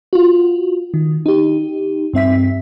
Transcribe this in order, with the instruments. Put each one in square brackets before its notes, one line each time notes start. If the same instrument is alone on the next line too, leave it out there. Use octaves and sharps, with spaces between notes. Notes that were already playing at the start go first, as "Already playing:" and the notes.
[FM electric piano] F4 F#4
D#3
D#4 G4
G2 C4 E5 B6